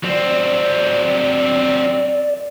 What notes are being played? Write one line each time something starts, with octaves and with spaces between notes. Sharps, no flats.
F#3 C4 D5